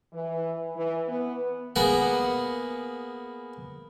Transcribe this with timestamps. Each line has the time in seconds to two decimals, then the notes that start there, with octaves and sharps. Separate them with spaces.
0.13 E3
0.76 E3
1.08 B3
1.76 A#3 B3 G#4 F#5